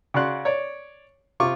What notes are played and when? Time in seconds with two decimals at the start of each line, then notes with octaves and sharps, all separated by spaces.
0.14 C#3 F#4 D5 C6 F#6
0.45 C#5 D5
1.40 C3 F4 C#6 D6